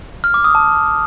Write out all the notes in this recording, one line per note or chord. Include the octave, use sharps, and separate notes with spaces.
F6
D6
D#6
A5